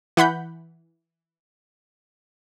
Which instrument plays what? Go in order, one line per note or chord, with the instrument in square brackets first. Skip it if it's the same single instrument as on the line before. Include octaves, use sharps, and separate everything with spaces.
[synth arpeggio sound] E3 F#5 B5 G6